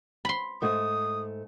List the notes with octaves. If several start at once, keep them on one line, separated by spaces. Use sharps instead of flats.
B5 C6
G#2 A3 D#6